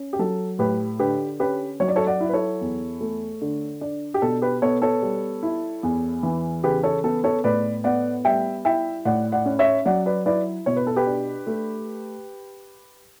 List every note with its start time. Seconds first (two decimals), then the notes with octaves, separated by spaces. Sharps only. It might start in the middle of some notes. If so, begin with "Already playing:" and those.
Already playing: C#4
0.13 G4
0.19 F#3 A4
0.59 A2 G4 B4
0.99 D3 G4 B4
1.40 C#4 G4 B4
1.80 F#3 C#5
1.88 D5
1.96 A4 C#5
2.07 D5 F#5
2.20 E4
2.29 B4
2.33 A4 C#5
2.61 E2
3.01 A3
3.41 D3
3.81 D4
4.14 G4
4.22 B2 A4
4.42 G4 B4
4.62 B3 A4 C#5
4.82 A4 C#5
5.02 G3
5.43 E4
5.83 E2
6.23 E3
6.64 C#3 G4 B4
6.83 A4 C#5
7.04 B3 A4
7.24 A4 C#5
7.44 A2 B4 D5
7.84 B3 D5 F#5
8.25 G3 E5 G5
8.65 E4 E5 G5
9.05 A2 D5 F#5
9.32 D5 F#5
9.46 C#4
9.59 C#5 E5
9.85 F#3 D5 F#5
10.06 B4 D5
10.26 E4 B4 D5
10.66 B2 C#5
10.76 B4
10.87 A4
10.96 G4 B4
11.07 D4
11.47 A3